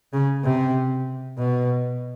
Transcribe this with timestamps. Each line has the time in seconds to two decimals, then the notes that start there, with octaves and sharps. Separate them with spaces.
0.13 C#3
0.44 C3
1.38 B2